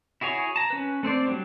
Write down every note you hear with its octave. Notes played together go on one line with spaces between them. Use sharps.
E4 F#4 G#4 C#5
A5 A#5
C#4 B4
A3 C4 C5 D5
F#3 G3 D4